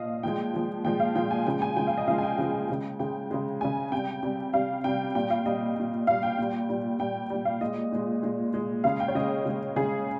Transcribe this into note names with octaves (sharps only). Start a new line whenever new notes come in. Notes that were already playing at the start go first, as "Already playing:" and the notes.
Already playing: A#2 F3 D#5 F5
A#2 F3 G#3 G5
A#2 F3 G#3
A#2 F3 G#3 G5
F5
A#2 F3 G#3 G5
G#5
C#3 F3 G#3 G5
G#5
C#3 F3 G#3 G5
F5
D#5
C#3 F3 G#3 F5
G#5
G5
C#3 F3 G#3
C#3 G#3
C#3 G#3 G5
C#3 G#3
C#3 G#3 G#5
C3 G3 G5
C3 G3
C3 G3 F5
C3 G3 G5
A#2 G3 G5
F5
A#2 G3 D#5
A#2 G3
A#2 G3 F5
G5
A#2 G3
A#2 G3
A#2 G3 G5
A#2 G3
F5
A#2 G#3 D#5
A#2 G#3
A#2 G#3
A#2 G#3
C#3 G#3 F5
G5
C#5
C#3 G#3 D#5
C#3 G#3
C#3 G#3 G#4